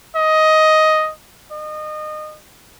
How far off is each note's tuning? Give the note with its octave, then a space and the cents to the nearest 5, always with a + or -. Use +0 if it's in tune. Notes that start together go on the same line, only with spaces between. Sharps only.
D#5 +10
D#5 -25